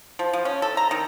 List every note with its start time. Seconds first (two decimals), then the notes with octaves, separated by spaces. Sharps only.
0.19 F3
0.33 F3
0.45 C#4
0.62 A4
0.77 A#5
0.91 D#3